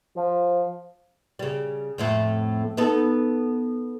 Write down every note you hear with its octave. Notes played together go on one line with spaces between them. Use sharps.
F3
C#3 G3
F2 A2 A3
B3 D#4 A4